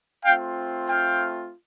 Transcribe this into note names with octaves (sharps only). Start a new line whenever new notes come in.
A3 C4 F4 F5 G5
F5 G5